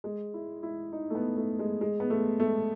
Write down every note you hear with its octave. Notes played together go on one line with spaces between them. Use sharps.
G#3
E4
E4
D#4
A3
B3
A3
G#3
G#3
B3
A3
A3